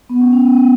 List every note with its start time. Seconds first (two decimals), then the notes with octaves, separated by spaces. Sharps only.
0.10 B3
0.21 C#4
0.33 C#4
0.46 B3
0.57 B3